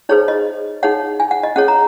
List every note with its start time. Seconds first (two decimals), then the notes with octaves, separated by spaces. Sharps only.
0.09 D#4 G#4 C5 C#5
0.28 D#5
0.83 D#4 G#4 C#5 F#5
1.20 G#5
1.31 F#5
1.43 D#5
1.56 C#4 G#4 C#5 F#5
1.68 A#5